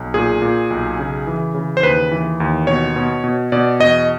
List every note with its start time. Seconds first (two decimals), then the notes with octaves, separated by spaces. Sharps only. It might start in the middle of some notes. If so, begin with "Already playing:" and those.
Already playing: B1
0.14 A#2 G#4
0.42 A#2
0.70 B1
0.99 C#3
1.27 E3
1.54 C#3
1.77 C5
1.83 D#2 B4
2.12 E3
2.40 D#2
2.67 B2 C#5
2.96 B2
3.24 B2
3.52 B2 D5
3.80 E2 D#5